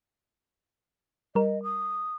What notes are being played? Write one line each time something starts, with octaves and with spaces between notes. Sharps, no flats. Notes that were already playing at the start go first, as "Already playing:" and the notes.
G3 A#4 D#5
D#6